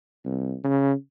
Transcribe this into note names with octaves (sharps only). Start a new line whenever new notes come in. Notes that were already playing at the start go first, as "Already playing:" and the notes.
C2
C#3